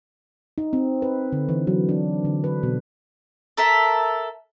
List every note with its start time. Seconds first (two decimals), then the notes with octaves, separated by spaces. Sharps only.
0.58 D#4
0.73 C4
1.02 B4
1.32 D3
1.49 E3
1.67 F#3
1.89 D4
2.25 D3
2.44 B4
2.63 B2
3.57 A4 A#4 E5